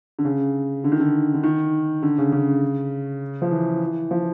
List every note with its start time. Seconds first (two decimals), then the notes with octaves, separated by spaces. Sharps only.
0.19 D3
0.25 C#3
0.84 D3
0.92 D#3
1.00 D3
1.34 D3
1.44 D#3
2.03 D3
2.18 C#3
2.32 C#3
3.42 F3
3.51 E3
4.11 F3